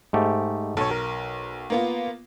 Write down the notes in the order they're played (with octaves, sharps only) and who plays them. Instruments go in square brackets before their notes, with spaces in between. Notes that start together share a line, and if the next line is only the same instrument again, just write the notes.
[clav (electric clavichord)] G#2 A3 G4
[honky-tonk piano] B1 [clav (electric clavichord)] A4 C#5
[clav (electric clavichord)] A#4
[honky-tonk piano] A#3 B3 F4